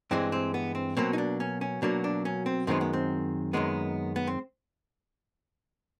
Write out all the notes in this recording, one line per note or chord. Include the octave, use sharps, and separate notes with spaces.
G2 E3 G#3 C4
C4
B3
C4
B2 F#3 A#3 C4
D#4
D4
C#4
C#4
B2 F#3 A#3 D4
D4
C#4
C4
F#2 D#3 G#3 B3 C4
B3
C4
F#2 D#3 G#3 B3
B3
C4